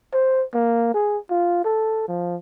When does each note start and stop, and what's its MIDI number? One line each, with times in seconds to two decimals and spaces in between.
0.13 0.44 72
0.54 0.93 58
0.94 1.18 68
1.30 1.62 65
1.65 2.03 69
2.08 2.36 53